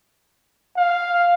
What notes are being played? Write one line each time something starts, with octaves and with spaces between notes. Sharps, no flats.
F5